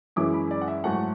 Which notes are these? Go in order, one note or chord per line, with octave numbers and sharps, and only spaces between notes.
F#2 E3 G#3 C#4 E4 D6
B5
D5
F#5
E5
G#2 F#3 A3 E4 F#5